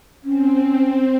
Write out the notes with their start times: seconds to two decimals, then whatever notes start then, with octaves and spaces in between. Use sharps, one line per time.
0.24 C4 C#4